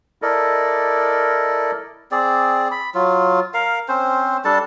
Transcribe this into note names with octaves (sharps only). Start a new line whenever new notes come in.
E4 A4 A#4 D5 D#5
C4 G#4 D5
B5
F#3 F4
A#4 F5
C4 C#4 C5
G3 D4 A4 A5